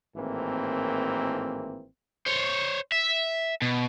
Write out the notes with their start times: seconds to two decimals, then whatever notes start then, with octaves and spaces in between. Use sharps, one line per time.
0.16 G#1 A2 E3 A#3 C4
2.26 C5 C#5
2.92 E5
3.62 B2